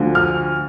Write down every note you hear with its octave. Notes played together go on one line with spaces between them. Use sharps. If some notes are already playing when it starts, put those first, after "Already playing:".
Already playing: D2 D3 F3
F6